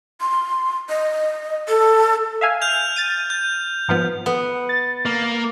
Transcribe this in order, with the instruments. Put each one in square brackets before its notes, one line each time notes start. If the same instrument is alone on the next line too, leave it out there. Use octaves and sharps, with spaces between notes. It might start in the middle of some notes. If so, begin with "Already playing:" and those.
[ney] C6
D#5
A4
[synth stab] E5 F5 G#5
[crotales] F6 G6 F7
[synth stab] A6 D#7
[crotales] G6
[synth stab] G#2 F3 B3
[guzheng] B3
[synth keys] A6
[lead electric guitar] A#3